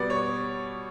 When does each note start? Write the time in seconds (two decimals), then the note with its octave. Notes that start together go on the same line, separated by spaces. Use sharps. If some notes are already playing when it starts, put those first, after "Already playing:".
Already playing: B2 G3 B3 D5
0.10 C#5